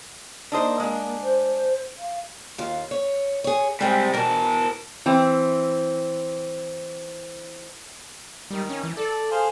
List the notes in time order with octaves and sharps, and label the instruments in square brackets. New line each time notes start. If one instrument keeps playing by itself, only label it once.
[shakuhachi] A#3 [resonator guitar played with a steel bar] D4 D#4 C5
[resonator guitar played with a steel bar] G#3 D4
[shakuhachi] C5
F5
[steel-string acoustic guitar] D#2 F4
C#5
G#4 C#5
[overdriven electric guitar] C3 G3 [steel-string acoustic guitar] G#3 G5
[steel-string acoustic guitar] B2 E3 [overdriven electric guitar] A#4 A5
[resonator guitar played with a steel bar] E3 C4
[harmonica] D#3 [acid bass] G3
[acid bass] C#4
E3
[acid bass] A4 [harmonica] D5
[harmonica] G#4 C5 F5